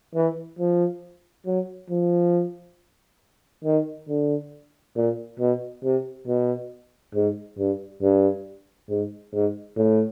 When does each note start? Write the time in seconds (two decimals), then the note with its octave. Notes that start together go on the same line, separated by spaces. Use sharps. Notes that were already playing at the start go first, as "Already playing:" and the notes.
0.15 E3
0.59 F3
1.46 F#3
1.90 F3
3.64 D#3
4.09 D3
4.96 A#2
5.39 B2
5.84 C3
6.27 B2
7.15 G#2
7.58 G2
8.02 G2
8.89 G#2
9.33 G#2
9.77 A2